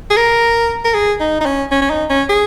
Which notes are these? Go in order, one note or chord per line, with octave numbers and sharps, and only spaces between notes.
G#4
A#4
A#4
G#4
D#4
D#4
C#4
C#4
C#4
D#4
C#4
G#4